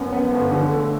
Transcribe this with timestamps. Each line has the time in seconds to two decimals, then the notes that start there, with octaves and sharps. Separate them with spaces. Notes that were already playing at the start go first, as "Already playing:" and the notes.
Already playing: F#2 B3
0.13 B3
0.32 G1
0.52 D3
0.71 A3